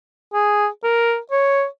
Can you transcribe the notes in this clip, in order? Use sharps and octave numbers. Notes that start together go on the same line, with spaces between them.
G#4
A#4
C#5